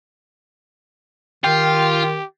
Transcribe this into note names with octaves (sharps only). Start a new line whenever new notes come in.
D#3 F4 G4 G5